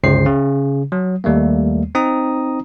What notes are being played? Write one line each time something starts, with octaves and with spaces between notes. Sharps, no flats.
G1 C#2 C#3 C5 C7
C#3
F#3
D#2 G3 A3 A#3
C4 D#4 A#5 D#6